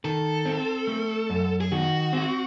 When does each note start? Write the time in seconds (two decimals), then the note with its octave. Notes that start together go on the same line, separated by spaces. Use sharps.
0.05 D#3 A4
0.46 C4
0.87 A3
1.30 F#2
1.61 G#4
1.72 D#3 F#4
2.13 C4